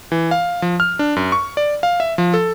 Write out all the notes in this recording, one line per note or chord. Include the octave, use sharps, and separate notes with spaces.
E3
F5
F3
F6
D4
F#2
C#6
D5
F5
E5
F3
A4